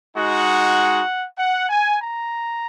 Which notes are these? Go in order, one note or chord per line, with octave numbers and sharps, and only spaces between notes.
G#3 D#4 F#4 F#5
F#5
G#5
A#5